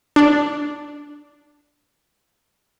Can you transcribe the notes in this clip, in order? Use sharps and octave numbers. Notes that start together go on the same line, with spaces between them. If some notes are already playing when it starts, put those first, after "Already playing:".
D4